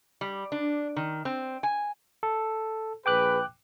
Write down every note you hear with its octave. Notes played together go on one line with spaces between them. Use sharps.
G3
D4
D#3
C4
G#5
A4
A#1 G#4 B4 G5 D6 F#6